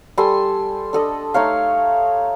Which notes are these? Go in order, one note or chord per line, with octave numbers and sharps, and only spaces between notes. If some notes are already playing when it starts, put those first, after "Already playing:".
G3 A4 G#5 C6
D4 A4 D#5
A3 D#4 C#5 F5